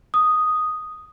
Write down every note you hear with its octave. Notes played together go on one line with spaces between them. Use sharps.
D#6